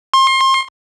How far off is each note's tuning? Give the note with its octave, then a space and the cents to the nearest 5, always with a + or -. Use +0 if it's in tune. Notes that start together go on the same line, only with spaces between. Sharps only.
C6 +30